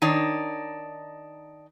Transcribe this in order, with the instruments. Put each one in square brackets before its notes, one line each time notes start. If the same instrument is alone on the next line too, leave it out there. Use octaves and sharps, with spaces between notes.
[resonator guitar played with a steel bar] D#3 D4 D#4 C#5